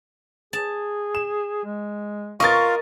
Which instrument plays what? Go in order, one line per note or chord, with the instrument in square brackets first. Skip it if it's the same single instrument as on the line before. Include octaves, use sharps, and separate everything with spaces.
[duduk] G#4 [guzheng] A5
[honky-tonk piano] E7
[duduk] G#3
[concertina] F4 F5 [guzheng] A#4 D#5 [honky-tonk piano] C#6 A6